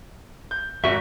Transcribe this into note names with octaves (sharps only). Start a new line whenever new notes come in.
G6
G#1 F#4 E5 C#6